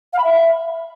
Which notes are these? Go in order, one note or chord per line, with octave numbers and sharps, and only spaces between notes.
F5
B5
E5